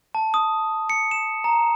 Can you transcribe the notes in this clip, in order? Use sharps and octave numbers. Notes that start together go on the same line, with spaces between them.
A5
D#6
C#7
E7
A#5